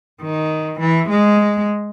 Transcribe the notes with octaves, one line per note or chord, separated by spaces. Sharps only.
D#3
E3
G#3